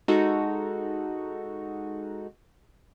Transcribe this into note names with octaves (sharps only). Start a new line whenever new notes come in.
G#3 D#4 F#4 A4